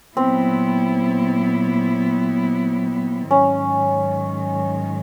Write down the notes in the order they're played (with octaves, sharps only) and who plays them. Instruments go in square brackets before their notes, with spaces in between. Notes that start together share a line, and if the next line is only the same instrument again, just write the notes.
[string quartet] A#2 F#3 B3 E4 [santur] C4
[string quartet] G#2 D#3 F#3 [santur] C#4